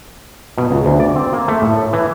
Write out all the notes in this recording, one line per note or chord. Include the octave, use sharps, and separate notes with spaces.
B2
C#2
D2
D5
C4
A#3
A3
A2
E3